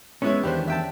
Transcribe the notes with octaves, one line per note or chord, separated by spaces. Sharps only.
E3 G#3 B3 C#4 E4 C#5
E2 D#3 D4 G4 B4 C5
E5 G5 A5